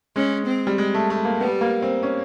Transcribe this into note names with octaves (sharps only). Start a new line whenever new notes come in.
G#3 C#4
C4
G3
G#3
A3
A3
A#3
G3 B3
A#3
C4
C#4